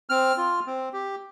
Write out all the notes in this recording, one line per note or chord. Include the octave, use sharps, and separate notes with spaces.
C4 F6
F4
C4
G4